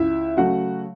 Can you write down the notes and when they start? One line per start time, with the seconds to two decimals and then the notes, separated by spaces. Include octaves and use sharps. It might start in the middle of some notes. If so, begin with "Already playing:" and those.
Already playing: C#2 E4 E5
0.37 C#3 F#3 A3 F#4 F#5